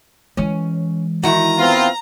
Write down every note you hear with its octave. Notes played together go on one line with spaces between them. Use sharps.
E3 G#3 C#4
D#3 E4 F#4 A#5
B3 C4 F4